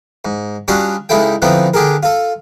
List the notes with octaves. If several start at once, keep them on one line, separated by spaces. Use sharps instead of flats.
G#2
G3 C#4 D4 F4 F#4 D#5
C#2 G#3 D#4 E4 A4 G5
D3 E3 F3 B3 C4 D#4
D3 D4 G4 G#4 A#4
F4 A4